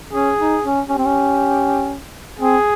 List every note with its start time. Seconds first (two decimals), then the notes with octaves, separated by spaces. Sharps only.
0.13 C#4 G#4
0.39 D#4
0.63 C#4
0.89 C#4 G4
0.98 C4
1.05 C#4
2.39 C4 G#4